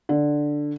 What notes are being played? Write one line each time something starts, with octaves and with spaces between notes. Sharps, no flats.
D3